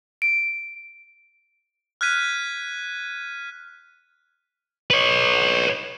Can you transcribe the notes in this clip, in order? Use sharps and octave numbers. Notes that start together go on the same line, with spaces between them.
D7
F6 F#6 G#6 B6 D#7
B4 C#5